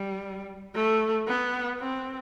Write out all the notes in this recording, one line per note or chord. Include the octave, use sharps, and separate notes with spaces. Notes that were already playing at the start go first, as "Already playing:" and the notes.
Already playing: G3
A3
B3
C4